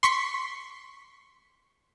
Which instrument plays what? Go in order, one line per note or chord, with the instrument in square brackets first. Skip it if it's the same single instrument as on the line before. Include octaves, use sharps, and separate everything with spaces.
[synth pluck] C6 C#6 B6 C#7